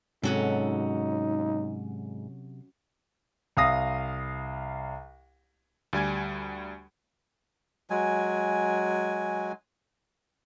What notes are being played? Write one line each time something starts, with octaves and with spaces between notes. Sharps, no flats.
G#2 C3 F#3 C#4 D#4 F#4 A4
C2 F5 D#6 A#6
D2 G3 G#5 G#6
F#3 G#3 G#5